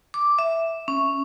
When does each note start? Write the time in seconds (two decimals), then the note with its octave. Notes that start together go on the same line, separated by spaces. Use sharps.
0.14 D6
0.39 E5
0.88 C#4